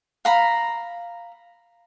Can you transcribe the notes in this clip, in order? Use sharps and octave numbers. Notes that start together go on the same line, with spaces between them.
F5 A#5 B5